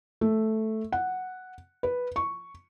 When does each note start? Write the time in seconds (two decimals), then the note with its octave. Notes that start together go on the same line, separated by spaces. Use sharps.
0.21 A3
0.92 F#5
1.83 B4
2.16 C#6